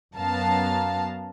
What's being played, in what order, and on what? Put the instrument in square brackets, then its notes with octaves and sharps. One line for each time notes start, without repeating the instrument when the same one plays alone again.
[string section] F#2 B3 F5 A5 A#5